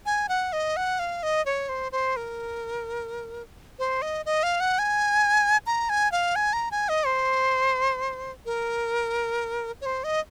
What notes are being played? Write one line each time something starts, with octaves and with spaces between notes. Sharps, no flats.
G#5
F#5
D#5
F#5
F5
D#5
C#5
C5
C5
A#4
C5
D#5
D#5
F5
F#5
G#5
A#5
G#5
F5
G#5
A#5
G#5
D#5
C5
A#4
C#5
C5
D#5